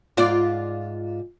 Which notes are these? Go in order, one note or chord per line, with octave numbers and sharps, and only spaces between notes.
G#2 F4 D5